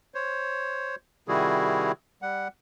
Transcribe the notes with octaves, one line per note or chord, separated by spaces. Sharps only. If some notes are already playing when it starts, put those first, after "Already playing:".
C5 C#5
C3 D#3 G3 E4 F#4 G#4
G3 F#5